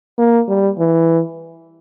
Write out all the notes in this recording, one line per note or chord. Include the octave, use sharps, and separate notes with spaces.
A#3
G3
E3